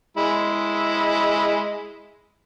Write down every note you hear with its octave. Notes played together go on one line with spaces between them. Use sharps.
G#3 E4